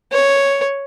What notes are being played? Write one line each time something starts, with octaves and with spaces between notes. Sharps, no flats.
C#5